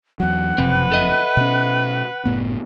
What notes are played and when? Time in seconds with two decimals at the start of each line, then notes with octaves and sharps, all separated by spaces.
0.20 E2 F#3 F#5
0.58 F#1 F2 C3 C4 B4
0.92 A4 D#5 E5
1.37 B2 C#4
2.25 F#1 A2 B3